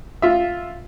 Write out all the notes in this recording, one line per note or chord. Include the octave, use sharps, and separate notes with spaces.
F4 E5